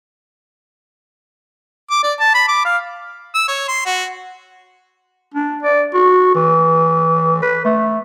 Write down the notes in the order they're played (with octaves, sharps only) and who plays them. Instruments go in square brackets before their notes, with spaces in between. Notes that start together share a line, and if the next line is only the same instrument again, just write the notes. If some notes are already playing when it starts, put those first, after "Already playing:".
[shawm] D6
D5
A5
B5
D6
F5
[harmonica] E6
C#5
C6
F#4
[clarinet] D4
D5
F#4
E3
B4
A3